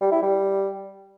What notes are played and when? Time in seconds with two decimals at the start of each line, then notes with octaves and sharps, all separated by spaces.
0.01 G3
0.12 E4
0.22 G3